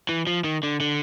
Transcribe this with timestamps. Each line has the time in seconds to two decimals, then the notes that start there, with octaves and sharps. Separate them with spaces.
0.09 E3
0.27 F3
0.44 D#3
0.63 D3
0.80 D3